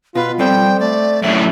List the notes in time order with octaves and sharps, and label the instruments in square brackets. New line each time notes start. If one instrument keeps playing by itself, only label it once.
[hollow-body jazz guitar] B2 [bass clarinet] F4 [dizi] B4
[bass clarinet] G3 [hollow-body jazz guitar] C4 A4 C5 [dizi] G5
[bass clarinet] A3 [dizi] D5
[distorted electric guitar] F#2 A2 [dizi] E5